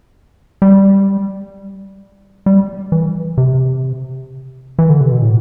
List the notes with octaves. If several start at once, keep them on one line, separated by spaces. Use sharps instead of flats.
G3
G3
E3
C3
E3
D3
C3
B2
A2